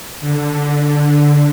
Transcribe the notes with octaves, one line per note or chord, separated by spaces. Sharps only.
D3